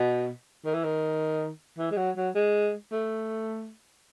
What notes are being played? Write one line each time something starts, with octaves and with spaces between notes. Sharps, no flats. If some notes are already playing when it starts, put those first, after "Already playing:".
Already playing: B2
D#3
E3
D#3
E3
G#3
F#3
F#3
G#3
A3